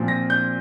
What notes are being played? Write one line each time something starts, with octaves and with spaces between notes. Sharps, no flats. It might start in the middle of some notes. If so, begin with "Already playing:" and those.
Already playing: A#2 F3 C4
A#6
G6